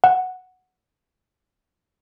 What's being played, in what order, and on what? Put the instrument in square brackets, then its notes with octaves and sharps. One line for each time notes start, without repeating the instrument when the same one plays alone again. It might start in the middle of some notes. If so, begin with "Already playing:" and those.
[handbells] F#5